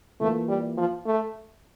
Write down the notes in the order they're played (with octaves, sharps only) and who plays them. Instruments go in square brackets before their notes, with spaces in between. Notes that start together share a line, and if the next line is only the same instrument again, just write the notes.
[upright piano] E3 A#3 F4 [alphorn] A3
[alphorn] G3
F3
A3